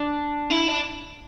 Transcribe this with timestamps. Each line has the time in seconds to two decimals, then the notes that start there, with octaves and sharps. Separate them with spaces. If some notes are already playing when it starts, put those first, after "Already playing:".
Already playing: D4
0.51 E4
0.68 D4